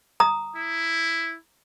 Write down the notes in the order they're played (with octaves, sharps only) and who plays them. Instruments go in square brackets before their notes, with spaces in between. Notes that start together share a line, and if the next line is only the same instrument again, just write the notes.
[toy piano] A#5 D#6
[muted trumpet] E4